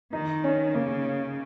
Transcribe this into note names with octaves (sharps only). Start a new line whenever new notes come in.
D#3 D#4
C#4
C#3 A#3